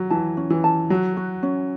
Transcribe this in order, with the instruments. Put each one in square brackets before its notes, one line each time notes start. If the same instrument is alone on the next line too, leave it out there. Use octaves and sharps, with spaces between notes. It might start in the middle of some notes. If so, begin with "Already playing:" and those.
Already playing: [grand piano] F#3 [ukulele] F#4
[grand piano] E3 [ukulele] A5
[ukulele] C#4
[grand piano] E3
[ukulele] A5
[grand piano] F#3 [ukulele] F#4
[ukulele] F#4
C#4